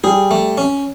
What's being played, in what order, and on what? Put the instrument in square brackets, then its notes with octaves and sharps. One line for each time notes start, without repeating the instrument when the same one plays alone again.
[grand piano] G3 [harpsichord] G#4
[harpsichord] A3
C#4